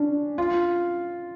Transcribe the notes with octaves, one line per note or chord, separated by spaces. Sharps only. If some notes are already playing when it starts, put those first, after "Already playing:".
Already playing: C#4 D4
F4